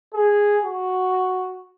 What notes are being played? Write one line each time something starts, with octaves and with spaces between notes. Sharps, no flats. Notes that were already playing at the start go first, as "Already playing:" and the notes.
G#4
F#4